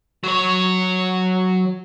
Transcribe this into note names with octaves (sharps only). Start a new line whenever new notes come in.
F#3 C#5